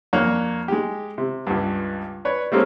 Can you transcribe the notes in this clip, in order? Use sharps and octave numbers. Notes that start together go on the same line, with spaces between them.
F2 A#3 D4 C#5 A#5 F#6
G#3 G4
C3
C#2 G2
B4 C#5 D5
G3 A3 A#3 C4 C#4 G#4